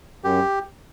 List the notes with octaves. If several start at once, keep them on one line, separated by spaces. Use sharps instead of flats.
F#2 G4